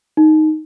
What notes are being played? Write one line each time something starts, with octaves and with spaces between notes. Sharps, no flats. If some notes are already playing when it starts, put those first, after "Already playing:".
D#4